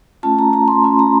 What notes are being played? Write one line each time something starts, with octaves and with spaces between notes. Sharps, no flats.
A3 C#4 F4 A5
A#5
A#5
C6
A3 C#4 F4 B5
A#5